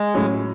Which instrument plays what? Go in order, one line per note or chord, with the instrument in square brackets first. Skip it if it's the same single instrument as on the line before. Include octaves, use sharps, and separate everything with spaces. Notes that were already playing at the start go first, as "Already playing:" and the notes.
Already playing: [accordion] G#3
[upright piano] A2 F#3 C#4